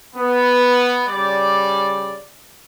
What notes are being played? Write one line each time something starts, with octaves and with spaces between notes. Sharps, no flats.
B3
C#3 G3 D5